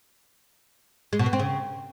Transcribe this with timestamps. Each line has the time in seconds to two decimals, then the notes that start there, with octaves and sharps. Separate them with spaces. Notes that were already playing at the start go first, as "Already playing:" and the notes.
1.13 G#3
1.19 B2
1.26 B3
1.33 C4
1.40 C#3